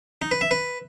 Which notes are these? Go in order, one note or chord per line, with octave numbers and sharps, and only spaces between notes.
D#4
B4
E5
B4